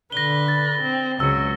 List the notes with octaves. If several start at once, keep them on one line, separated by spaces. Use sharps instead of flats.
D3 B4 A#6 G7
A6
C4
C#2 F#3 E6 C#7